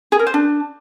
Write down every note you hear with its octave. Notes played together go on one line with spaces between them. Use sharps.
G#4
A#4
C5
D4